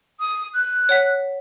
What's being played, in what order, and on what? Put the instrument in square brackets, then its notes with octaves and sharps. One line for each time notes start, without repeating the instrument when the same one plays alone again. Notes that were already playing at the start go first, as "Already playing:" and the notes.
[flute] D#6
F#6
[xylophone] C#5 F#5 B6